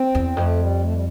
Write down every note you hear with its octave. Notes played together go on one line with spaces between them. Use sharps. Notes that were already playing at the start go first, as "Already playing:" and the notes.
Already playing: C4
E2
F2 A3
G3
A3
G3